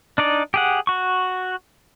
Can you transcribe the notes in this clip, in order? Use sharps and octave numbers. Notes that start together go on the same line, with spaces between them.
D4 D#4 D5
G4 G#4 F#5
F#4 C#6